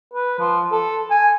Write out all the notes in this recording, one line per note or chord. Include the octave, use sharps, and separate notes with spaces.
B4
F3
A4
G#5